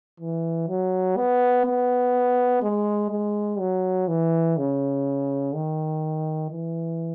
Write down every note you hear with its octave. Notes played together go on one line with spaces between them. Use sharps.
E3
F#3
B3
B3
G#3
G#3
F#3
E3
C#3
D#3
E3